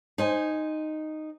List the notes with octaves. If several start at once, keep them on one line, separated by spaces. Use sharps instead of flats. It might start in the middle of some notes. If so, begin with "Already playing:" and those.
D#4 C5 G#5